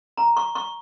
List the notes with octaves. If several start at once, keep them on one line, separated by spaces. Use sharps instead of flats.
A#5
C#6
C#6